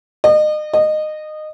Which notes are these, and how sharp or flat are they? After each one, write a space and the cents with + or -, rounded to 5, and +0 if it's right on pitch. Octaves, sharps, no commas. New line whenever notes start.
D#5 -35
D#5 -20